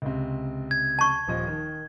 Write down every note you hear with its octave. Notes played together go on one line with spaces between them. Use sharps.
C#2 C3
G#6
A5 C#6
D#1 F3 D#5
D#3